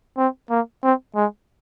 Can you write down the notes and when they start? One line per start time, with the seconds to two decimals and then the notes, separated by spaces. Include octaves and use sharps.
0.17 C4
0.50 A#3
0.83 C4
1.15 G#3